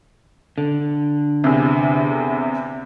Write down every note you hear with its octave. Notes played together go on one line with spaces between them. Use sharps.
D3
E2 C3